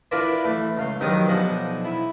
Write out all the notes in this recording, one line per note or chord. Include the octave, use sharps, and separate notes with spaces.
D4 E4 F4 A#4 B4 D5
E3 A3
C#2 F5 C6
G2 D#3 F3 F#3 A#4 D#6
B1 F3 D4 D#5 F#5 G#5
E4